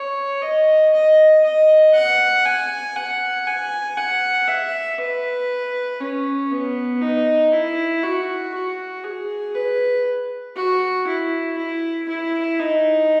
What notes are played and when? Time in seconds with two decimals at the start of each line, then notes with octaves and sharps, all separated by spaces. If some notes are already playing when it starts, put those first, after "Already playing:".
Already playing: C#5
0.42 D#5
0.93 D#5
1.44 D#5
1.94 F#5
2.45 G#5
2.96 F#5
3.47 G#5
3.97 F#5
4.48 E5
4.98 B4
6.00 C#4
6.51 B3
7.02 D#4
7.52 E4
8.03 F#4
8.54 F#4
9.04 G#4
9.55 B4
10.56 F#4
11.07 E4
11.57 E4
12.09 E4
12.59 D#4